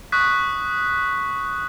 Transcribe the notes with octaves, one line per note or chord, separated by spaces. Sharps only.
C#6 D#6 F#6 B6